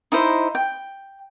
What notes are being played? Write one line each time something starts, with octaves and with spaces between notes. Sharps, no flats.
D#4 E4 C5
G5